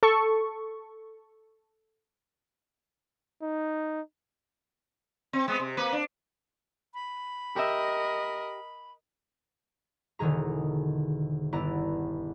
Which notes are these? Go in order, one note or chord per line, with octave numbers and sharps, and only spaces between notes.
A4 C#6
D#4
C4
G#3 B3
C3
A#3 B4
D4
B5
G4 A#4 D#5 E5
E1 D3 D#3 G#4 A#5
G1 B3 E4 D5 A#5